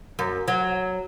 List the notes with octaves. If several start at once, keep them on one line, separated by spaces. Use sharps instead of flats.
F#2
F#3